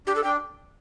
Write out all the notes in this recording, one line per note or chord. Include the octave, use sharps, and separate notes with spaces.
D4 G4
A4
D4 G5